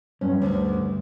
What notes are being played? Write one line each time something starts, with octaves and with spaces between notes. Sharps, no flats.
G2 C#4
D2